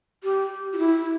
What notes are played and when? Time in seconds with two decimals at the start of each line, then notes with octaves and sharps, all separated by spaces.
0.24 G4
0.73 F4
0.78 E4